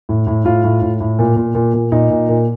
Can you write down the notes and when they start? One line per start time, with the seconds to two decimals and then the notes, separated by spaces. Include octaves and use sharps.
0.09 A2
0.27 A2
0.45 A2 F4
0.64 A2
0.82 A2
1.01 A2
1.19 A#2
1.36 A#2
1.55 A#2
1.74 A#2
1.92 A#2 D#4
2.10 A#2
2.29 A#2